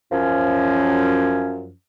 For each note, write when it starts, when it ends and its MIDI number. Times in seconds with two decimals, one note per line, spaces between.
0.11 1.71 42
0.11 1.71 53
0.11 1.71 61